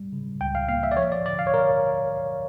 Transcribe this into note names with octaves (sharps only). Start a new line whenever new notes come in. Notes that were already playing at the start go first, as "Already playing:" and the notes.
Already playing: G3
C#3
C#2 G5
F5
A#3 F5
E5
D5
F3 C#5
D5
D3 D5
F5
C#5
A#4